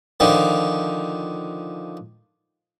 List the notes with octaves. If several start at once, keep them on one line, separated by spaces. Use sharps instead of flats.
D3 D#3 F3